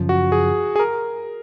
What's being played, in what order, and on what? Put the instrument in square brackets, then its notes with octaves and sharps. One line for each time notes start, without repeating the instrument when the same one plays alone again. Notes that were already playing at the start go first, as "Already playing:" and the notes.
Already playing: [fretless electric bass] F#2 C#3 F3
[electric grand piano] F#4
G#4
G#4
A#4